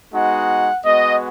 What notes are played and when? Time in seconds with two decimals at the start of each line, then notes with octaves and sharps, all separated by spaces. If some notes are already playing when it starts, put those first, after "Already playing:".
0.13 G#3 B3 D#4 F#4 F#5
0.83 G#3 B3 F#4 D#5